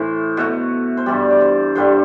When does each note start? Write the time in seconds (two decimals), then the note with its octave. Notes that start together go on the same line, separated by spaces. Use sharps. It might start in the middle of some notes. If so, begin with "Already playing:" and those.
Already playing: A2 E3 A3 C5
0.37 B2 A3
0.97 C5
1.06 G2 E3 G3 D5
1.30 D5
1.41 C5
1.75 G2 D3 G3 C5